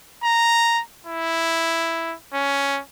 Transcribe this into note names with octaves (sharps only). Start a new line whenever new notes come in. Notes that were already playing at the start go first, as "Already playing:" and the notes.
A#5
E4
C#4